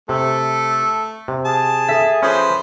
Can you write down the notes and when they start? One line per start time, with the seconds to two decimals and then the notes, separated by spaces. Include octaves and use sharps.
0.09 C3 A3 A4
1.28 C3
1.45 G#4 A5
1.88 A4 E5
2.23 F3 C#4 G#4 B4 C5